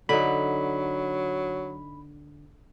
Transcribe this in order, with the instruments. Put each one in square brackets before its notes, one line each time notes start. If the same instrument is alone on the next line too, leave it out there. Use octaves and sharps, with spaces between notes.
[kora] D3 D#4 [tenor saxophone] F#3 [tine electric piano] B5